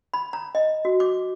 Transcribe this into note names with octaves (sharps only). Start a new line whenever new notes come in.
B5
A#5
D#5
F#4
D6